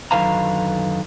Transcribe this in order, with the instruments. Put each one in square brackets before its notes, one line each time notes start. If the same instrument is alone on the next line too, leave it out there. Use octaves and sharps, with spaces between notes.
[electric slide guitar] F#2 D3 D#3 B4 F5 A#5